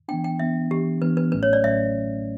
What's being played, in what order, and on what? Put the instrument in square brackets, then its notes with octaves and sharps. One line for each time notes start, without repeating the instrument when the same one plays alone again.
[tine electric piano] E3 B3 D4 [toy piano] G5
[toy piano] G5
[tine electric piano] E3 B3 D4 [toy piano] E5
[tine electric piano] E3 B3 D4 [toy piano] G4
[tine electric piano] E3 B3 D4 [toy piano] B4
[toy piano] B4
[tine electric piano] A1 A2 F#3 A3 C#4 [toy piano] B4
[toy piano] C#5
D5
[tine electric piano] A1 A2 F#3 A3 C#4 [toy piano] E5